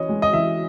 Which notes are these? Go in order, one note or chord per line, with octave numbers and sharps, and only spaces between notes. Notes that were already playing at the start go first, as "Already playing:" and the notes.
Already playing: E3 C#4 E4 C#5 D#5
G#3
D#5
E3 E5